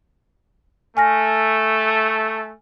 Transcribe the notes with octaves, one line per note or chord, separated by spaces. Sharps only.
A3 G#5 F6 A#6